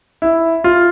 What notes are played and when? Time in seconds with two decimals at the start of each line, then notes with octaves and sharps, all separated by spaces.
0.22 E4
0.64 F4